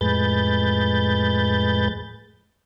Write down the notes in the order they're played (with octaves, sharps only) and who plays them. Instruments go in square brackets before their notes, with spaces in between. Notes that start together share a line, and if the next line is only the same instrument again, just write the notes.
[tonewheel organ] F2 A2 G#3 B4 G6 A6